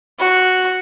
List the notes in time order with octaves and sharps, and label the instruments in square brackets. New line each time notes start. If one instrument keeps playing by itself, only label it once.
[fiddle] F#4